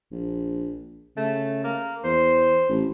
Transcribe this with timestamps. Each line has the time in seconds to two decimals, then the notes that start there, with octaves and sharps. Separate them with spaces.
0.12 A#1
1.17 C#3 A3
1.64 A#3
2.04 E2 C5
2.69 A1